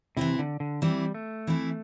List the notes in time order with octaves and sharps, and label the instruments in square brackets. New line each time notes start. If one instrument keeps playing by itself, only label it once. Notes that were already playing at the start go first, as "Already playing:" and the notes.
[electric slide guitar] C3 [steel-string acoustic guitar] E3 C4 E4
[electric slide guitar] D3
D3
[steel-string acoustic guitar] E3 C4 E4 [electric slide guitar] G3
[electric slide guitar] A3
[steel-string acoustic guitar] E3 C4 E4